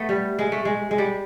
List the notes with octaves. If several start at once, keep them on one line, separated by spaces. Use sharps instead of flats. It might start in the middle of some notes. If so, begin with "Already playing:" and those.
Already playing: A3 B3
G3
G#3
A3
G#3
G#3
G3